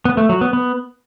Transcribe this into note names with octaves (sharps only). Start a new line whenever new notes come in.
B3
A3
F#3
B3
B3